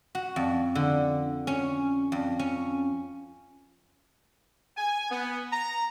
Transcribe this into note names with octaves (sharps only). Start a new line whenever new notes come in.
F#4
F2
D3
C#4
F2
C#4
G#5
B3
A#5